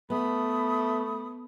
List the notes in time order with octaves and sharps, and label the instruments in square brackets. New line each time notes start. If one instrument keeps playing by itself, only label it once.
[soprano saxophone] A3 [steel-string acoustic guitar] B3 [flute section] B5 D#6